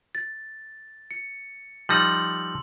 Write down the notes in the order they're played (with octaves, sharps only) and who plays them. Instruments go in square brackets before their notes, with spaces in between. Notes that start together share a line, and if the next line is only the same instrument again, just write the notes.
[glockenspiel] A6
C#7
[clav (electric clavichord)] F3 G3 D#4 [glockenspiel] C6 E6 F#7